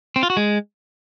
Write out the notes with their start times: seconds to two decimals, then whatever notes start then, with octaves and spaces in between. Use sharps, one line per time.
0.16 C4
0.23 F4
0.30 F#4
0.37 G#3